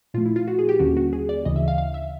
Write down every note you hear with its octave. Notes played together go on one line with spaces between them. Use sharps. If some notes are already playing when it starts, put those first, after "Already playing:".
A#2 F3 A3 F4
E4
F4
F#4
G#4
G4
D#2 D3 G3 A#3 C#4 F#4
F#4
G#4
D5
D2 C#3 E3 D#5
E5
F5
F5
E5